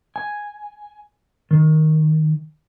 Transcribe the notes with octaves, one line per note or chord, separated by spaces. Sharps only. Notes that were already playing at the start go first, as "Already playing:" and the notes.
G#5
D#3